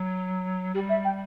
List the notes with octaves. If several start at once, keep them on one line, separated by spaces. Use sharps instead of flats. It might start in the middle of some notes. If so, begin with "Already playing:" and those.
Already playing: F#3
G3 G4
E5
G5